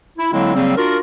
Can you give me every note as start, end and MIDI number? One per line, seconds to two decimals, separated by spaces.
0.18 0.31 64
0.33 0.54 50
0.33 0.54 54
0.33 0.54 56
0.33 0.54 58
0.33 0.54 60
0.33 0.54 64
0.55 0.76 49
0.55 0.76 54
0.55 0.76 55
0.55 0.76 58
0.55 0.76 60
0.76 0.98 62
0.76 0.98 65
0.76 0.98 66
0.76 0.98 70